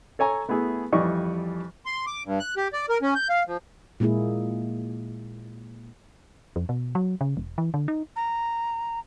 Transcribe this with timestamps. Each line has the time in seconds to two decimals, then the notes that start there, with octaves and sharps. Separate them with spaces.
0.19 A4 C#5 G#5 A#5
0.48 A3 B3 E4 G#4
0.93 F2 E3 G3 D5 D#5 C#6
1.86 C6
2.07 D6
2.25 G2
2.40 F#6
2.57 G4
2.73 D5
2.89 A#4
3.02 C#4
3.15 G6
3.29 F5
3.47 F3
4.00 A#2 G#3 A#3 E4 G#4
6.56 F2
6.69 B2
6.95 F#3
7.21 C#3
7.37 E1
7.58 E3
7.74 D3
7.88 D#4
8.16 A#5